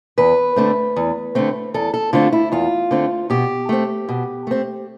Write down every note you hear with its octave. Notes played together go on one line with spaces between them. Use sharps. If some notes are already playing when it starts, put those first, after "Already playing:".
E2 B4
D3 A3 C4
E2
D3 A3 C4
E2 A4
A4
D3 A3 C4 F4
E4
E2 F4
D3 A3 C4
B2 G4
A3 C4
B2
A3 C4